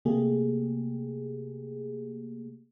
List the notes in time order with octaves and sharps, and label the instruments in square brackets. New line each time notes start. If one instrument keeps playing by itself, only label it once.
[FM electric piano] C3 A3 A#3 G4 G#4